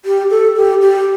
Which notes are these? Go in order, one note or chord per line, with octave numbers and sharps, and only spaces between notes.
G4
A4
G4
G4